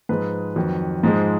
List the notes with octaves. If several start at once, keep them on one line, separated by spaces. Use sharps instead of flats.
G#2 F3 G#3 B4
F2 D#3 F#3
G#2 F3 G#3